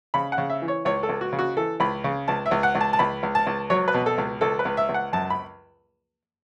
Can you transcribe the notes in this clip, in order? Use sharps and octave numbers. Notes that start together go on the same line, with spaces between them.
C#3 B5
F#5
C#3
E5
E3
C#5
C#2 C#5
A4
C#2
F#4
C#3
F#4
E3 A4
C#2 B5
C#3
C#2 A5
E5
C#2
F#5
C#2
A5
A5
C#2 B5
C#2
A5
C#2
F#3 C#5
B4
B2
A4
C#2
C#2 A4
B4
C#2
E5
C#2
F#5
F#2 A5
B5